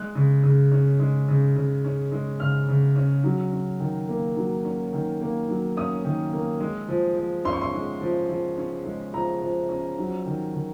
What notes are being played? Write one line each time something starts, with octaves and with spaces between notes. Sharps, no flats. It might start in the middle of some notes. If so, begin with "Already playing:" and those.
Already playing: G#3 F#6
C#3
C#3
C#4
G#3
C#3
C#3
C#4
G#3
C#3 F6
C#3
C#4
F#3
C#4
D#3
A#3
F#3
C#4
D#3
A#3
F#3
C#4 D#6
D#3
A#3
G#3
F3
F3
C#4 C6
C#6
C6
G#3
F3
F3
C#4
G#3
F3 A#5
F3
C#4
F#3
D#3
D#3